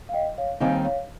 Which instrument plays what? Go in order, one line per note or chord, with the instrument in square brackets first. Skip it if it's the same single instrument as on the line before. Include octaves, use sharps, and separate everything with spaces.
[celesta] F5
D#5 G5
C#5 F5
[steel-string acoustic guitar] D#2 D#3 G3 C4 D#4 [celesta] F5 G#5
[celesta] C#5 F5